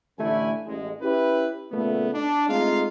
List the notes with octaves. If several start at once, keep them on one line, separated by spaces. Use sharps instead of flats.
A1 D3 A3 E4 G#5
A1 G#3
C#4 E4 G4 B4
A#2 C#3 A3 B3
D4
G#3 A3 C4 D#4 F4 F5